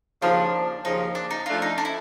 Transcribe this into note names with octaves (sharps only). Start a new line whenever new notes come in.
D#2 C#3 F3 D4
D#2 C#3 F3 D#4
D4
D#4
F3 A3 D4 F4
D#4
D4
E4